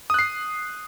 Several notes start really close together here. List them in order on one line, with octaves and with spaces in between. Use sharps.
D#6 F#6 C7